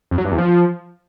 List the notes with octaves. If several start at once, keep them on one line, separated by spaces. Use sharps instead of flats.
F2
F#3
G2
E2
F3